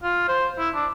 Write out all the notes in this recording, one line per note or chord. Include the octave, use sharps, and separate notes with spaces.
F4
C5
E4
D4